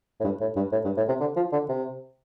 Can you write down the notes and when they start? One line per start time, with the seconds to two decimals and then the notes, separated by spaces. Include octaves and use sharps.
0.20 A2
0.24 G2
0.40 A2
0.56 G2
0.72 A2
0.85 G2
0.97 A2
1.08 C3
1.20 D3
1.36 F3
1.52 D3
1.69 C3